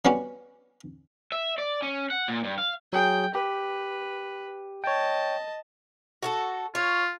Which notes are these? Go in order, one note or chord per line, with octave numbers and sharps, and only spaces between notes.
G3 B3 C#4 F#4 G4
E5
D5
C#4
F#5
A#2
G2
F5
F#3 G#4 G5
G4 B4
C#5 D#5 G5 A5
F#4 G#4 A4
F4 C#5